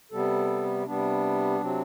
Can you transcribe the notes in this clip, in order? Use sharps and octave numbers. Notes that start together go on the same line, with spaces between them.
C3 G3 B3 A4
C3 G3 B3 D4
C3 F#3 C4